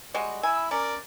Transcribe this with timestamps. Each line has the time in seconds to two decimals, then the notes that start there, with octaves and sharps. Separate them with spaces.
0.14 G3 G#3 F#4
0.43 E4 G#5 E6
0.71 C#4 A#4 D5